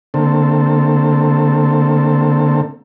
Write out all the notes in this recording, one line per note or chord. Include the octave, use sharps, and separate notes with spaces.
D3 A3 A#3 C4 A4